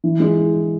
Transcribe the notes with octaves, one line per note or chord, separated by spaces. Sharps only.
E3
G#3